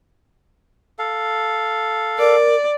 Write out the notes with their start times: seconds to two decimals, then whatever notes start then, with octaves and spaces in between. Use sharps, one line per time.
0.99 A4 F5
2.19 A#4 D5